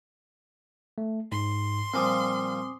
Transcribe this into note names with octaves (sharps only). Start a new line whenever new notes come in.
A3
G#2 C6
A#2 F3 G3 C4 G#5 D6 D#6